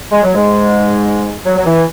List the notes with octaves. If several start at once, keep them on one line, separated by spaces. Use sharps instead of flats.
G#3
F#3
G#2 G#3
F#3
F#3
E3